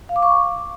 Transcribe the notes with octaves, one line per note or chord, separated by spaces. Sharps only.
F5
D6
C#6